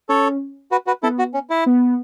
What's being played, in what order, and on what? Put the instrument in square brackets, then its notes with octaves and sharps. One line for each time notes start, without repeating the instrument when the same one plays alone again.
[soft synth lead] C#4 [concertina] A4 C#5
[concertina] F#4 B4
F#4 B4
[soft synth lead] B3 [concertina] E4 A4
[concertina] F#4
C#4
E4
[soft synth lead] B3